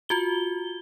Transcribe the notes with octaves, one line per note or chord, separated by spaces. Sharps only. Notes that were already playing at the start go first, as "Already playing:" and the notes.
F4 F#4 G7